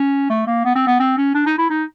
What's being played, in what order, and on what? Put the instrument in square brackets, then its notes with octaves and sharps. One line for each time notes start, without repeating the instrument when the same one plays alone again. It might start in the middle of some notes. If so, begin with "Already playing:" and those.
Already playing: [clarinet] C#4
A3
A#3
B3
C4
B3
C4
C#4
D4
D#4
E4
D#4